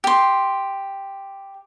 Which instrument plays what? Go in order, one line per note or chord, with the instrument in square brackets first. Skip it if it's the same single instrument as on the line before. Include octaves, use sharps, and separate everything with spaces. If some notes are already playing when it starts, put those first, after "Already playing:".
[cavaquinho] G4 C6